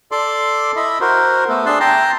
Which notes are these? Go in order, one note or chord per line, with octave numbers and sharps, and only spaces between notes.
A4 D5 C6 D6
E4 D#5 E5 B5
F#4 A#4 C5
A3 B3 A4
D4 G#4 E5 A5 C6 F#6
G5 A5 A#5 C6